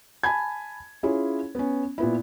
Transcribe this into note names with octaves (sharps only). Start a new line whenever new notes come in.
G#5 A5 B5 G#6
C#4 E4 F4 G#4 C#5
B3 C#4
A#2 B3 E4